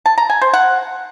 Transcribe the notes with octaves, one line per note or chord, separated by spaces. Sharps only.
A5
A#5
G#5
C5
F#5